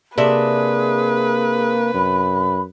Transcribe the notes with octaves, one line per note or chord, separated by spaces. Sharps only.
C3 A#3 D4 G#4 B4 E5
F#2 B5